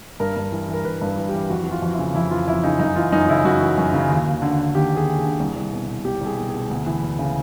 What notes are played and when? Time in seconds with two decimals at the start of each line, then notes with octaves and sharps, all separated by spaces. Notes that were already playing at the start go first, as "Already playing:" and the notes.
0.20 G2 A#4
0.36 G2
0.52 E3
0.68 E3 A#4
0.85 G2 B4
1.01 G2
1.07 B4
1.17 E3
1.29 G4
1.34 E3
1.50 F2 F#4
1.64 F#4
1.66 E3 F4
1.82 F2
1.93 E4
1.99 C#3
2.14 F2 E4
2.31 E3 F4
2.48 F2 E4
2.63 C#3 D#4
2.79 F#2 D#4
2.96 E3 F4
3.12 F#2 D#4
3.29 C#3 E4
3.45 F#2 F#4
3.61 E3
3.78 F#2
3.93 C#3
4.10 D#2
4.27 D#2
4.42 D3
4.59 D3
4.75 D#2 G4
4.91 D#2
4.97 G#4
5.07 D3
5.19 G#4
5.24 D3
5.40 C2
5.56 C2
5.73 B2
5.88 B2
6.05 C2 G4
6.21 C2
6.26 G#4
6.37 B2
6.49 G#4
6.54 B2
6.70 D2
6.86 E3
7.03 D2
7.19 C#3